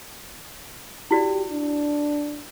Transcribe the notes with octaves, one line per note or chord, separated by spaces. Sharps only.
E4 F#4 G4 D5
D4